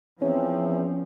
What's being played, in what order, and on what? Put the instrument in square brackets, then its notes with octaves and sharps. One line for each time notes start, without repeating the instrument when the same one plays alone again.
[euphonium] E2 [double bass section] F3 [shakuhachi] C4 [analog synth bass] C#4